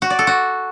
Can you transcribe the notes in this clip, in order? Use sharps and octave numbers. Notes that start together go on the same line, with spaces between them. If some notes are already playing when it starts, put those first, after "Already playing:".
F#4
D5
A4
F#4